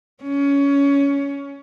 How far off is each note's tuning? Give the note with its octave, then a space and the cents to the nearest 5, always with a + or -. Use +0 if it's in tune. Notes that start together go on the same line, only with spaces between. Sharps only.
C#4 +20